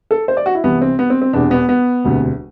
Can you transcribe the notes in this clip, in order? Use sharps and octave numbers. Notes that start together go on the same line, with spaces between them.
A4
C5
D5
F#4
E4
C2 C3 E3 B3
C4
B3
C4
C4
E1 E2 C3 D4
B3
B3
E1 D2 C3